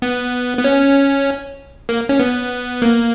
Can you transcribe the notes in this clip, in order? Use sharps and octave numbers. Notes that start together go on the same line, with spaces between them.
B3
B3
C#4
A#3
C#4
B3
A#3